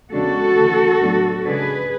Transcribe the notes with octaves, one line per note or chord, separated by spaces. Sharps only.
E2 C#3 G#3 D4 F#4 A4
D2 C#3 E3
A2 F#3 B3 D4
C#3 G#3 D4 G#4 B4